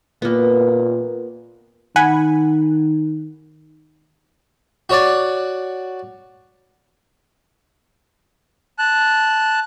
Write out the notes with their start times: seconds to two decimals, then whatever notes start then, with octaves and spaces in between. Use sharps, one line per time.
0.22 A#2 A#3 B3
1.96 D#3 F#5 G#5 B5
4.89 F#4 C#5 D5
8.79 A5 F#6